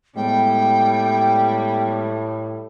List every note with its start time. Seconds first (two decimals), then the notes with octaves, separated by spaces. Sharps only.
0.16 A2 G3 G#3 B3 G5